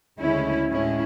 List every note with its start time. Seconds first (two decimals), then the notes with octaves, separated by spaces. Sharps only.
0.19 D2 C#3 G#3 C#4 E4
0.69 A2 G#3 C#4 E4